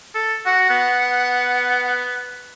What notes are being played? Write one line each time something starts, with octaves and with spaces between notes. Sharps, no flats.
A4
F#4 F#5
B3